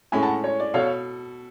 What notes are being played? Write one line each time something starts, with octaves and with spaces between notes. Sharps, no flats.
A2 G#3 C#4 G#5 B5
F#5 A5
C#5
D5
B2 A4 C#5 F5